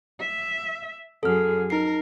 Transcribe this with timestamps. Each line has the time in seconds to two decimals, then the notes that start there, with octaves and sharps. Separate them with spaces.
0.20 E5
1.23 F#2 G#4 A4 F6
1.70 D#4 A#4 C7